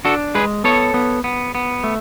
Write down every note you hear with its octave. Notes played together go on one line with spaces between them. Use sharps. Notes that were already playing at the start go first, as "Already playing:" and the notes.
D4 F#4 A4
G#3 G#4 B4
B3 A4 C#5
B3
B3
B3
A3